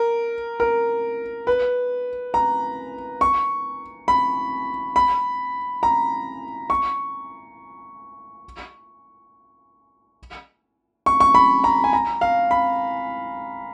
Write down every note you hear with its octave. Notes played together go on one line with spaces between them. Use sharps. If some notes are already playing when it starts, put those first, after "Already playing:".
Already playing: A#4
A#4
B4
A#5
C#6
B5
B5
A#5
C#6
C#6
C#6
B5
A#5
G#5
A#5
F5
B5